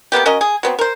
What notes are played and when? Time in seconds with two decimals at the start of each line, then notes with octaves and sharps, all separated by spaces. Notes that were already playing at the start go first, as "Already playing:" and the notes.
0.12 C3 A#3 B3 G4
0.26 C#4 F#4 A#4 D#5
0.41 G#4
0.63 F#3 B3 C4
0.79 A#4 C5